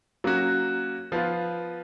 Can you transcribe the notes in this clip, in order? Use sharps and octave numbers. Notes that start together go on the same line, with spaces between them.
F#3 A#3 C#4 F#4
F3 B3 F4